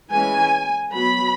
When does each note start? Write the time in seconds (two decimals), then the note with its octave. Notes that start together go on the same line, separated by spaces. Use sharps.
0.10 E3 G#3 C#4 G#5
0.93 F#3 B3 B5